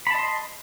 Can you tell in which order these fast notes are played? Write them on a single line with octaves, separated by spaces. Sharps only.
B5 A5 D#5 C6